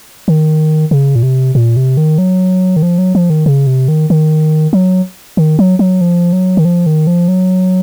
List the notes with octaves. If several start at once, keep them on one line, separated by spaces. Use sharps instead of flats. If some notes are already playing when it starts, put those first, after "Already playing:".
D#3
C#3
A#2
C3
A#2
C3
D#3
F#3
D#3
F3
F#3
F3
D#3
C#3
C3
D#3
D#3
F#3
D#3
F#3
F#3
F3
F#3
D#3
F3
D#3
F3
F#3